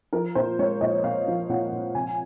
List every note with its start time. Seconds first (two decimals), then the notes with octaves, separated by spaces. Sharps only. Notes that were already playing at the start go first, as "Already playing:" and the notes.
0.13 F3 A#4
0.35 A#2 C5
0.59 G#3 C#5
0.81 A#2 D#5
1.04 A#2 F5
1.28 F3
1.49 A#2 F#5
1.72 A#2
1.95 C3 G#5